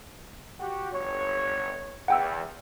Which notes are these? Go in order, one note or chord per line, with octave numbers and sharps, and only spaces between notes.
F#4 G4
G1 C#5
E2 F#5 G5 E6